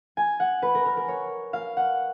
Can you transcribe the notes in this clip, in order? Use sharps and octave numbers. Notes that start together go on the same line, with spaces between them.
G#5
F#5
B4
A#4
A#4
A#4
C#5
F5
F#5